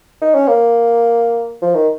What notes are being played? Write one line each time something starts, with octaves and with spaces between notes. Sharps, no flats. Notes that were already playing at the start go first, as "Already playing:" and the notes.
D#4
C#4
A#3
F3
D#3